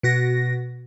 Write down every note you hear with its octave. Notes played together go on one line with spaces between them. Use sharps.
B2 F#4 A#6